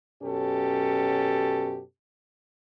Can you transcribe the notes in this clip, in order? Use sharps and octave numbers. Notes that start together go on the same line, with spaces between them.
F#2 B2 C#4 G4 A4